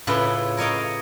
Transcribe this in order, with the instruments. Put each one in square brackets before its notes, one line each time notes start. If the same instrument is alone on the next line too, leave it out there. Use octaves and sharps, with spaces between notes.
[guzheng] A2 C#3 F4 A4 B4 B5
A#4 C#5 D#5 F5 G5